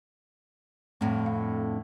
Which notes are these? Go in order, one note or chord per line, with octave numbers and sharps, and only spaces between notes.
F2 A2 D3 A3 C4
F5